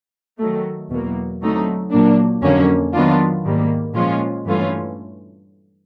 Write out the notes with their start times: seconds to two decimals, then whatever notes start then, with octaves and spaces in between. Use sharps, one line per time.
0.39 D#3 F#3 A3
0.90 E2 B2 F#3 A#3
1.41 D3 F#3 A3 C4 D#4
1.91 A#2 F#3 A#3 D4
2.42 F2 D3 F#3 A#3 C#4
2.93 D#3 F#3 B3 D4 F4
3.45 G#2 D#3 G3 A#3
3.94 A#2 F3 G#3 C#4 F4
4.45 G2 E3 A3 C#4 F4